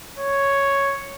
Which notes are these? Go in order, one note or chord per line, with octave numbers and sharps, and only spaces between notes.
C#5